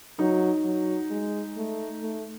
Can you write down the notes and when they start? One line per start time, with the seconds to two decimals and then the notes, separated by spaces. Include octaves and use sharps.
0.19 F#3 D#4
0.65 F#3
1.10 G#3
1.57 A3
2.02 A3